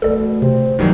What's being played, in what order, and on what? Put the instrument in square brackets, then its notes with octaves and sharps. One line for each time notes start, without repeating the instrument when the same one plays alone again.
[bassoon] B2 [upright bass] A3 E4 [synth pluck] A4 D5
[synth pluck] C3 [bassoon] C4
[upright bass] G2 A3 [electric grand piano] D#3 E3 F#3 [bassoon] G3